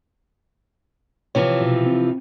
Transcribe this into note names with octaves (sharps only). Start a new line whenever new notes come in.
C3 E3 F3 C#5
B2
C4